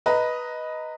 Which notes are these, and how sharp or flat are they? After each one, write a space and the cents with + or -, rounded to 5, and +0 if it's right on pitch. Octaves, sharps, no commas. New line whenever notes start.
B4 -5 D#5 +5 A#5 -20